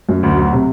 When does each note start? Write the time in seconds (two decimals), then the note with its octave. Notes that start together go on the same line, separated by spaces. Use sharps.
0.09 F#2
0.23 D2
0.37 F#3
0.53 C3